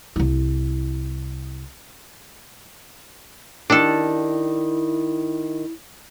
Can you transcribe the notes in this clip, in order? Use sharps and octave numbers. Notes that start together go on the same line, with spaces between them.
C2 E4
D#3 D4 E4 G4 A4 D5